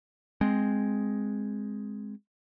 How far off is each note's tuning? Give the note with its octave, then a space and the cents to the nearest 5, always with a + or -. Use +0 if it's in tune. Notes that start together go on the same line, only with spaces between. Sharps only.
G#3 +0 C4 +0